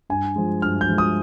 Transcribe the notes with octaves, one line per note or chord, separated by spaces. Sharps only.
G2 G#5
F3 G#3
G2 F6
G6
F3 G#3
D#6